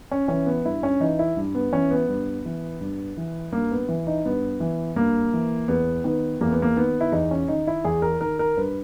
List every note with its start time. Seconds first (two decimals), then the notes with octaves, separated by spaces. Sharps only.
0.11 C#4
0.28 E3 C#4
0.46 B3
0.65 G2 E4
0.83 C#4
1.00 E3 D#4
1.19 E4
1.37 G2
1.55 B3
1.72 E3 C#4
1.91 B3
2.08 G2
2.45 E3
2.81 G2
3.17 E3
3.52 G2 A#3
3.71 B3
3.89 E3
4.07 D#4
4.25 G2 B3
4.60 E3
4.96 G2 A#3
5.33 E3
5.68 E2 B3
6.04 D#3 B3
6.41 E2 A#3
6.51 B3
6.62 A#3
6.76 D#3 B3
7.01 E4
7.12 E2 D#4
7.31 C#4
7.48 D#3 D#4
7.67 E4
7.84 E2 G#4
8.02 A#4
8.21 D#3 A#4
8.39 A#4
8.57 G2 B4